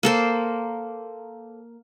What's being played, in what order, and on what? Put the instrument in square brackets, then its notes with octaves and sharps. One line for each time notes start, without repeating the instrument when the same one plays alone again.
[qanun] A#3 A4 C5